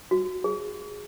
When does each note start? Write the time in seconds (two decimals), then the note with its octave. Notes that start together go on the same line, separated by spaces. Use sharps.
0.11 F#4
0.44 G#4